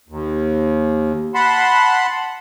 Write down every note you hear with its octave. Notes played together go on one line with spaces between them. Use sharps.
D#2
F#5 A5 B5 C6